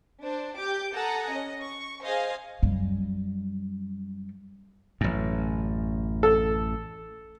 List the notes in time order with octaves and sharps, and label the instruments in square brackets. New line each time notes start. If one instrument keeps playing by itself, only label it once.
[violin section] D4 C5
G4 D6 G6
A4 F#5 G#5 A#5 D#6 F#6
C#4 D#5
C#6
G#4 C5 D#5 F5 G#5
[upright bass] F#2 G3
[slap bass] A1 F#2
[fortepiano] A4